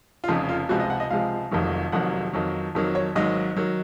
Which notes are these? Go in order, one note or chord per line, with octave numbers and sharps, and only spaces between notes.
F4
F1 F2 C#3 D#4
F4
C#2 C3 F3 G#3 F#4
D#5
F#5
D#5
C#2 C3 F3 G#3 F5
F1 F2 C3 D#3 F#3
F1 F2 C3 D#3 F#3 F#5
F2 D#3 F#3
F2 D#3 F#3
C#5
G#1 G#2 D#3 F#3 D#5
D#3 F#3